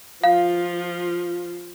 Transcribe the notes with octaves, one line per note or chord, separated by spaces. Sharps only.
F3 F4 F5